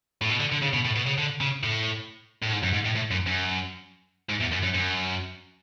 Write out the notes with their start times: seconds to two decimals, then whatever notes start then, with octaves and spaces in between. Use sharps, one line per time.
0.21 A2
0.29 B2
0.40 D3
0.52 D3
0.62 C#3
0.74 B2
0.85 A2
0.96 B2
1.07 C#3
1.18 D3
1.41 C#3
1.63 A2
2.42 A2
2.52 G#2
2.63 F#2
2.73 G#2
2.85 A2
2.96 A2
3.11 F#2
3.26 F#2
4.29 G#2
4.40 E2
4.52 F#2
4.62 F#2
4.74 F#2